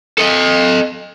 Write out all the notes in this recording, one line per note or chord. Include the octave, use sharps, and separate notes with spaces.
A4 D#5